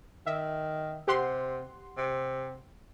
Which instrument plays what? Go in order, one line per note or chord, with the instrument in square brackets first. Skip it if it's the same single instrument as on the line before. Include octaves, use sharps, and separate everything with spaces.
[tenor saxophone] D#3 [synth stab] E5
[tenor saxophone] C3 [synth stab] G4 F#5 C6
[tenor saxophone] C3